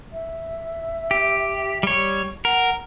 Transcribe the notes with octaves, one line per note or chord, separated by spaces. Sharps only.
E5
G4
G3 C#5
A#4 F#5